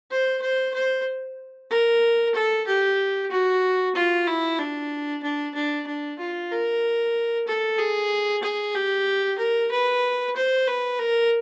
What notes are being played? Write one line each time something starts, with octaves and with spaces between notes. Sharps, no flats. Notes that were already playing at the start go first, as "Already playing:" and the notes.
C5
C5
C5
A#4
A4
G4
F#4
F4
E4
D4
D4
D4
D4
F4
A#4
A4
G#4
G#4
G4
A#4
B4
C5
B4
A#4